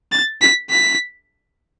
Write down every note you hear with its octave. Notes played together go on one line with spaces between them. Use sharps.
A6
B6
B6